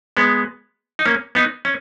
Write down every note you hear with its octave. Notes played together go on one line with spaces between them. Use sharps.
G#3 B3
D#4
A#3 C#4
B3 D#4
C#4